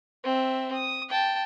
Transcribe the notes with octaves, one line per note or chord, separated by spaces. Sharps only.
C4 E5
D#6
G5 A5